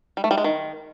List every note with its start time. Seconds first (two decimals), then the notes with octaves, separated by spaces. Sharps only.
0.17 G3
0.24 A3
0.31 G3
0.38 G#3
0.44 D#3